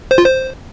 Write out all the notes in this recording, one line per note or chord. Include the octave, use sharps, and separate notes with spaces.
C5
F4
C5